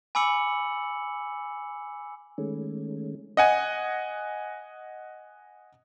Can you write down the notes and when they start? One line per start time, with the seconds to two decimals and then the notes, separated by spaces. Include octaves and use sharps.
0.15 G#5 B5 D6 E6 C#7 F#7
2.38 D#3 G#3 A3 C#4
3.37 D#5 F#5 G#5